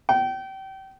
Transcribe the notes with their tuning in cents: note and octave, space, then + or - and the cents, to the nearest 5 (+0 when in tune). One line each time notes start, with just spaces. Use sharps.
G5 -30